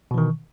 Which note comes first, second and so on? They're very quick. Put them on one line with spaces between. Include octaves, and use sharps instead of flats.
B2 E3 D#3